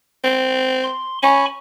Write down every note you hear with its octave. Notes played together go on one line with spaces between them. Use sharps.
C4
C6
C#4 G#5 B5 C#6